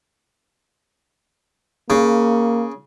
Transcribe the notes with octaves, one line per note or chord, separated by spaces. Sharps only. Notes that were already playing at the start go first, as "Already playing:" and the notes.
C#3 A#3